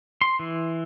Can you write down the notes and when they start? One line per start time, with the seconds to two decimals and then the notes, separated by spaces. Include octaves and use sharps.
0.21 C6
0.39 E3